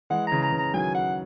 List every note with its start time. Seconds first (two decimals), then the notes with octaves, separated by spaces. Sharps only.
0.10 E3 G#3 F#5
0.27 A#5
0.32 C#3 E3
0.42 A#5
0.52 C#3 E3
0.58 A#5
0.74 D#3 F#3 G#5
0.94 F#5